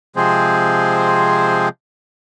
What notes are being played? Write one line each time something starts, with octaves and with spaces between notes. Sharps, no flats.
C3 F3 G#3 C4 G#4 C5